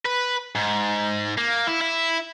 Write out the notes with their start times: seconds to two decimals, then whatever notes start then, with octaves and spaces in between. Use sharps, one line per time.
0.05 B4
0.55 G#2
1.38 A#3
1.67 E4
1.81 E4